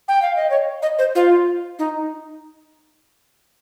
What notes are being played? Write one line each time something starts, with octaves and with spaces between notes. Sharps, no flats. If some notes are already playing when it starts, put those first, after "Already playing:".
G5
F5
D#5
C#5
D#5
C5
F4
D#4